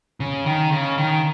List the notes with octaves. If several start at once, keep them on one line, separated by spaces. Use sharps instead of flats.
C#3
D#3
C#3
D#3